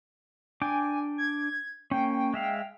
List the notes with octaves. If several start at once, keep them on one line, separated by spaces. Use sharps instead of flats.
D4 G5 G#5 D6
G#6
A#3 C#4 G5
G#3 E5 F5